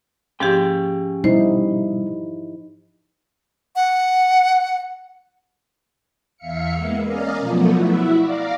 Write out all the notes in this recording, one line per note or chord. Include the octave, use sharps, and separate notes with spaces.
G#2 F3 C#4 G4 G5
B2 G3 D#4 E4 C5
F#5
E2 E5 F5 C#7
G#3 A#3 B3
C#4 A#4 D5 D#5 F5
B2 F3 F#3 A3 B3
E4 F#4 E5
D5 F5 A#5 D6